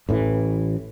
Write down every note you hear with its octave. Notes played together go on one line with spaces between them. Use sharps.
A1 A2 D#3 E3